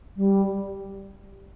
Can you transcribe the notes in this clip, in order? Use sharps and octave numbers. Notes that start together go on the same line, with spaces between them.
G3